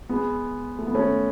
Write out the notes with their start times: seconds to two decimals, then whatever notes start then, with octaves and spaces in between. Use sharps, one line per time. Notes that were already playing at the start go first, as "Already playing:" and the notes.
0.09 G#3 B3
0.79 A3
0.87 B3
0.95 A3 C#4